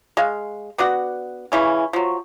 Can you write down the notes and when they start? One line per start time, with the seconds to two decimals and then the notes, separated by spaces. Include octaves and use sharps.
0.17 G#3 F5
0.78 B3 D4 F#4 F#5
1.52 C#3 E3 C#4
1.93 F3 F#3